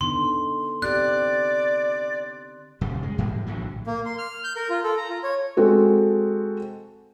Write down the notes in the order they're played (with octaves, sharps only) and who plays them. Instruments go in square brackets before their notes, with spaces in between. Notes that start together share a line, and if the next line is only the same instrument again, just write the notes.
[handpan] D3 B3 D#4 [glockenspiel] C6
[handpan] C4 G4 [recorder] D5 [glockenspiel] F#6
[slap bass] D#1 F#2 C#3 G3
G#3
G#2 E3 G3 G#3
A#1 A2 D3 F#3
[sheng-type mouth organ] A#3
C6
F6
G6
A#4
F4
A4
A#5
F4
C#5
[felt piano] G#3 C4 F#4 A4